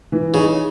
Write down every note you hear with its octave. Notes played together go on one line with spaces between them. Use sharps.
E3
C#3 D#4